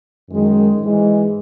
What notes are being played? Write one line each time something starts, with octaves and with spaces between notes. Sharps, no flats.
F#2 D#3 G#3
G#2 E3 G#3